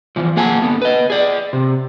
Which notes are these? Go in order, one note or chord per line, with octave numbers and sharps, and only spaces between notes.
E2 E3 F3
A#3 G#4 F#5 G#5 A5
D3 B3
B4 D#5
G#4 D5
C3